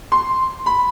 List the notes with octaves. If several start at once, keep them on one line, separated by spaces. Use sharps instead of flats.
C6
B5